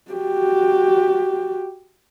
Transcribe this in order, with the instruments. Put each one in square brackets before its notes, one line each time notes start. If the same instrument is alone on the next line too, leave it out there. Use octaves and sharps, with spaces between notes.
[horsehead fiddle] F#4 G4